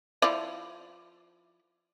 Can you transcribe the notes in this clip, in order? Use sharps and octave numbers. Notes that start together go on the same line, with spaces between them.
F3 E4 D5